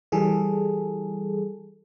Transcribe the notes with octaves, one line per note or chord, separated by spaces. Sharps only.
E3 G3 G#4 A4